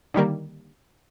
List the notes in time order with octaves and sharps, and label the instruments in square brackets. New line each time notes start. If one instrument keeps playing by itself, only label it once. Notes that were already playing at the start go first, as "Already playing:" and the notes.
[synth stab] D3 D#3 G3 A#3